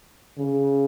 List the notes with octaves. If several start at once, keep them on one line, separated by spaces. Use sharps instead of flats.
C#3